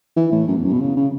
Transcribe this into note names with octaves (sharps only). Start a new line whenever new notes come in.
E3
A2
F#2
E2
F#2
B2
C#3
C#3